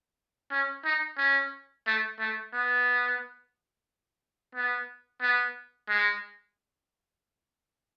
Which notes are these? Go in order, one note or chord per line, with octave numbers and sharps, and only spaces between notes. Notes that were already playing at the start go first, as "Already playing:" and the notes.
C#4
D#4
C#4
A3
A3
B3
B3
B3
G#3